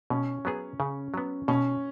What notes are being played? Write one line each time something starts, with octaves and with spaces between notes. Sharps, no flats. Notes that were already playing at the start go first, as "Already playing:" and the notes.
B2 C#4
F#3 B3 G#4
C#3
F#3 B3
B2 C#4